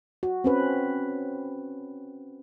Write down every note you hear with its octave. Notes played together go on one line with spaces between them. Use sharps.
F#4
C4 C#4 B4